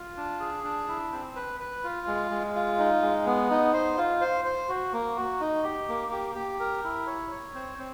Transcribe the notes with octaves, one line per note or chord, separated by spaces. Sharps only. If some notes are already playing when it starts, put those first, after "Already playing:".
Already playing: F4
D4
G#4
D4
E4
C4
B4
B4
F4
G#3
G#3
F4
D#4
G#3
B3
D#4
C5
F4
C5
C5
F#4
A#3
F#4
D#4
G4
A#3
G4
G4
A#4
E4
C#5
C#5
C4
C4